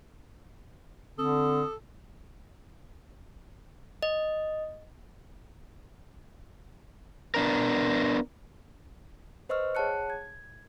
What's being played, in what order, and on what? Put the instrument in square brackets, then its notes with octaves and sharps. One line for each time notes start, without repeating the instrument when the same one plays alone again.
[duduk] D3 [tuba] C4 [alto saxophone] A4 [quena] D#6
[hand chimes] D#5
[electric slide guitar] B3 D4 A#4
[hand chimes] B4 C5 D#5 C#6 E6 F6
G#4 C#5 F#5 A5 F#6 C#7
G#6